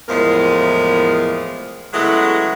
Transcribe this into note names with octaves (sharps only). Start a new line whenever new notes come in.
E2 A2 F3 G#3 A#3 A#4
C#3 F#3 G#3 A3 B3 E4